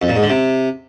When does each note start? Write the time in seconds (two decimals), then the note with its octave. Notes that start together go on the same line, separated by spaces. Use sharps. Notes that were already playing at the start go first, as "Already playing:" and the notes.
0.02 F2
0.09 A#2
0.16 G#2
0.23 D3
0.30 C3